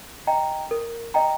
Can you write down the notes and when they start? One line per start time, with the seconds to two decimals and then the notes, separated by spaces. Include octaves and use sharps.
0.27 D#5 G5 A#5
0.71 A#4
1.14 D#5 G5 A#5